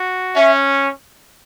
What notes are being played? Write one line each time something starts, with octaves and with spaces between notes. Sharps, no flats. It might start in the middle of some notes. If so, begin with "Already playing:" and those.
Already playing: F#4
C#4 E5